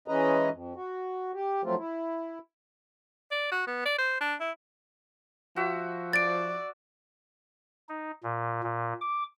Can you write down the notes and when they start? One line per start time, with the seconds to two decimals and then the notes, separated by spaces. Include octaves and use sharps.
0.08 E3 G#3 C#4 B4 D#5 A#5
0.51 F2
0.76 F#4
1.34 G4
1.64 F3 F#3 A3 C4 F4
1.78 E4
3.31 D5
3.51 F#4
3.67 B3
3.85 D5
3.98 C5
4.21 D4
4.40 E4
5.56 F3 F#4 E5
6.13 D5 A6 D7
7.89 D#4
8.23 A#2
8.63 A#2
9.01 D6